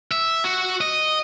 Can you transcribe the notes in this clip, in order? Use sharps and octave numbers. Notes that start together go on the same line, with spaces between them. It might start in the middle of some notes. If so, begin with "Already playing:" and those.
E5
F#4
D#5